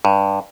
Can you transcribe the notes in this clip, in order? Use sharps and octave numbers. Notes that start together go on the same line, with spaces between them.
G2